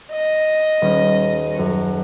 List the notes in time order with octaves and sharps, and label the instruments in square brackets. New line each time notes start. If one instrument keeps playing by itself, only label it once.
[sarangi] D#5
[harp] D#1 C#4
F#2 A4 C#6